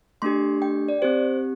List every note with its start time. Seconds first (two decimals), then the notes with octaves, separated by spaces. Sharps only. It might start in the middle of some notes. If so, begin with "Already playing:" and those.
0.22 A3 D4 G4 C6
0.62 G5
0.88 D5
1.02 C4 G4 C5